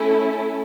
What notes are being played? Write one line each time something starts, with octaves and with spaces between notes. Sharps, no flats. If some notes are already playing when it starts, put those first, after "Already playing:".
Already playing: A3 C#4 E4 A4